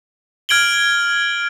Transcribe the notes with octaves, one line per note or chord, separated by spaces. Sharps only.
F6 G#6 D7 F#7 G7